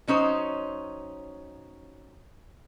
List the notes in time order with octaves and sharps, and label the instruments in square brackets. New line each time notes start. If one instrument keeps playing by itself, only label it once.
[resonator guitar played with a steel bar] F#3 C#4 D#4 C5